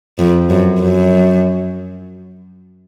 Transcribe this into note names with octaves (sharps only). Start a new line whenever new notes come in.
F2
F#2
F#2